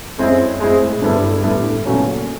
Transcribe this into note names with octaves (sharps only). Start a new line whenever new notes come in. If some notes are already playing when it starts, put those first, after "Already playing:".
F#2 G#3 C4 E4 G#4
A2 G#3 C4 E4 G#4
G2 D3 G3 B3 E4 A4
A2 D3 G3 B3 E4 A4
E2 A#2 C#3 F#3 A3 C#4